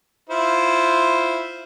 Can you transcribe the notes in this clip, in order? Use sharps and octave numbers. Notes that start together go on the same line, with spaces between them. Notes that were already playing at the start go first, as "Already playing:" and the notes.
E4 F4 C5